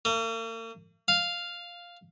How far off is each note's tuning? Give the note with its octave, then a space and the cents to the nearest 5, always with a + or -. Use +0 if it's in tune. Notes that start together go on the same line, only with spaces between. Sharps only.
A#3 -45
F5 +0